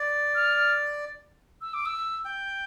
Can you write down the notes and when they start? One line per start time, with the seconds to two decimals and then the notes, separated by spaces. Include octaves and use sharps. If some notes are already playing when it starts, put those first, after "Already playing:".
Already playing: D5
0.35 F6
1.61 E6
1.74 D6
1.86 E6
2.25 G5